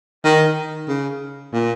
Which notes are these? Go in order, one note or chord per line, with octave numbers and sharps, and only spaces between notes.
D#3
C#3
A#2